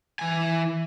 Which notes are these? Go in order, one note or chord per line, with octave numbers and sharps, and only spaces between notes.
E3 G#5